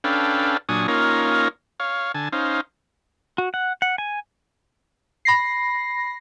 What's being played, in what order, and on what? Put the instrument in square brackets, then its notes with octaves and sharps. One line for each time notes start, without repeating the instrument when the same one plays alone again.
[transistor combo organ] C#4 D4 A4 B4 F5 G5
A#2 F#3 D4 G#5 C#6 D#6
A#3 C#4 D#4 F4 A#4 C#5
C#5 F5
D3 G#5 A5
C#4 D#4 C5 F5
[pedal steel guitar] F#4
F#5
F#5
G#5
[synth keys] B5 A#6 C7